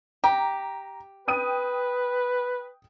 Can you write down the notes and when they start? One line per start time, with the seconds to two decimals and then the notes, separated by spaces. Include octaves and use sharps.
0.24 G4 A#5
1.28 B4 G5 D#6 D#7